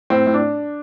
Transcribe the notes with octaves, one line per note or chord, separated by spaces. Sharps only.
A2 C4
A2
D4